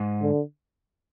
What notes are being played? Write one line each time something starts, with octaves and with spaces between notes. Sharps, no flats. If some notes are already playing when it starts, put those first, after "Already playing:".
Already playing: G#2
D3